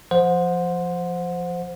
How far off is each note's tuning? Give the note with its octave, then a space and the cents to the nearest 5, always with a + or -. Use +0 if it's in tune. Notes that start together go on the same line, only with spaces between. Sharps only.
F3 +0 C5 -5 F#5 -30